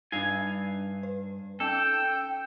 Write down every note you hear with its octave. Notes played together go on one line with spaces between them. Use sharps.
G2 D4 D#4 F5 G#5
B4
C#4 D#4 A4 G5